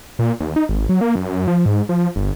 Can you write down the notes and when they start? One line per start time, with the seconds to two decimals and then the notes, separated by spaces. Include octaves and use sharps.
0.19 A#2
0.40 D#2
0.56 D#4
0.69 G#1
0.89 F#3
1.01 A#3
1.16 F#2
1.48 F3
1.66 G#2
1.89 F3
2.16 G1